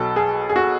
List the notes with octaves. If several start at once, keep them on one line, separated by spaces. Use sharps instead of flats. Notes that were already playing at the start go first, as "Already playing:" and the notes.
Already playing: B1 B2 F#3 A4
G#4
G#4
F#4